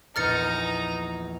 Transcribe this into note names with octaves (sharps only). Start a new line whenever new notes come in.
A#1 E2 A#2 D#4 A#5 F6 A6 C#7